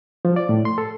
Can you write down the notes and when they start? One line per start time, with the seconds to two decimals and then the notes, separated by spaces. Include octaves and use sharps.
0.25 F3
0.36 D5
0.49 A2
0.65 C6
0.78 A4